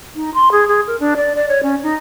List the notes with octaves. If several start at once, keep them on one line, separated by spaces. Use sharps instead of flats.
D#4
C6
G#4
G#4
A#4
D4
D5
D5
C#5
C#4
D#4